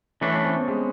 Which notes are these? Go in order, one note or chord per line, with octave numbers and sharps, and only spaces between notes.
E3 A3 C#4 D4
C#4
C4
B3
G#3